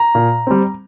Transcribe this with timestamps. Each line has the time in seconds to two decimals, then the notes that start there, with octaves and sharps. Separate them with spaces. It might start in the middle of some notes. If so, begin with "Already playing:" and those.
Already playing: A#5
0.15 A#2
0.47 G3 C4